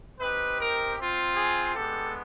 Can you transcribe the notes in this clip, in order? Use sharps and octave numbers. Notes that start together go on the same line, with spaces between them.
C4 D#4 G4 B4
A#4
C4 F4
G#4
G#3 B3 D4 G4 A4